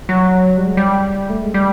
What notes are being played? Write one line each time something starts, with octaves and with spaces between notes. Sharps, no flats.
F#3
G3
G#3
G3
A3
G#3
G3